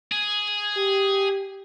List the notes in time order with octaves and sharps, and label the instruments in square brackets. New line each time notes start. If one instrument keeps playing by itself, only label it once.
[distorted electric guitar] G#4
[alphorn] G4